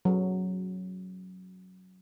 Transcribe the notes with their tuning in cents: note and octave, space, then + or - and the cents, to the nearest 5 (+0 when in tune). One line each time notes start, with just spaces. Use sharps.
F#3 +0